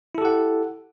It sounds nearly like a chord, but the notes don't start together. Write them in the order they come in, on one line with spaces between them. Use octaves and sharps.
E4 A4 G4 F#5